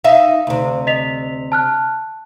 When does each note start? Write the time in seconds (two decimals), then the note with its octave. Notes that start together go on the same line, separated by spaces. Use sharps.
0.04 D#4 E5 F5
0.47 D2 C3
0.87 D#5 B6 F7
1.52 A5 F6 F#6